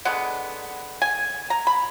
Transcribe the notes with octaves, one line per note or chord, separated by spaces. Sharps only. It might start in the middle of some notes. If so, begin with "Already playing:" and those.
D3 G#3 B3 F#5
G#5
A#5
B5